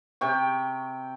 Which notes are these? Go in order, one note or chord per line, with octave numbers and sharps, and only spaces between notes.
C3 G5 C#6